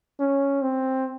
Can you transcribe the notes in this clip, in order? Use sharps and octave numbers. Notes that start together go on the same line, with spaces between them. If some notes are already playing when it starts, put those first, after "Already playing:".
C#4
C4